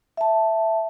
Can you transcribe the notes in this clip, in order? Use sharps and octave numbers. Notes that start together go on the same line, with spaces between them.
E5 A5